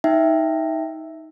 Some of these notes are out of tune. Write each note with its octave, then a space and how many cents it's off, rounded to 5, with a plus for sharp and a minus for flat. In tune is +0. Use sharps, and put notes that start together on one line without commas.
D#4 +15 E5 +0 G5 +0